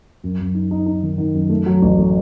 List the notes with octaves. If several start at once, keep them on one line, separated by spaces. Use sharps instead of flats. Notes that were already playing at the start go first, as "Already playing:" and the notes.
F#2
F#2
D#4
D#4
D#4
D#3
D#3
F#2
A3
F#3
A1
A3